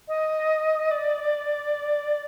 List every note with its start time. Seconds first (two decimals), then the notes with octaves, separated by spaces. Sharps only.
0.08 D#5
0.91 D5